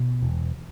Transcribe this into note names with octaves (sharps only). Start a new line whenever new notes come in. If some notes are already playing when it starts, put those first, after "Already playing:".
Already playing: B2
E1